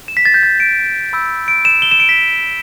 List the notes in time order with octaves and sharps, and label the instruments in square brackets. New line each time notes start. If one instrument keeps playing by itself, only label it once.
[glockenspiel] E7
B6
A6
G6
A6
D7
B5 E6 G6
D7
E7
G7
E7
D7
B6